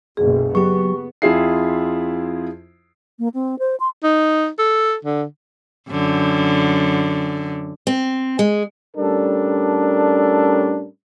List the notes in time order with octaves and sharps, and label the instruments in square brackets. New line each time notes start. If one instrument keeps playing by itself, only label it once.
[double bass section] F#1 B1 [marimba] G#4
[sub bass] F#3 [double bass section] B3 [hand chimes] G4 C#6
[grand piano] F2 E4 F4 G#4 E5 C7
[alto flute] A#3
C4
C5
C6
[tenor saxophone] D#4
A4
D3
[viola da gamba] F#2 D3
[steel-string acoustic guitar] C4
G#3
[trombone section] A2 G3 C#4 D4 A4 A#4